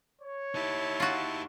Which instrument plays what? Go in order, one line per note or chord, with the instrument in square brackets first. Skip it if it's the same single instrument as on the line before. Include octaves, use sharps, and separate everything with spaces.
[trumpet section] C#5
[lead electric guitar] D#4 G4 [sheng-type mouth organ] E4 A5
[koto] F4 F#4